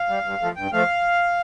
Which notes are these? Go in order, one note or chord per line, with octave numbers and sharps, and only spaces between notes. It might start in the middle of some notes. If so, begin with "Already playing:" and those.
Already playing: F5
G3
G2
F3 A3
G2 G5
F3 A3 F5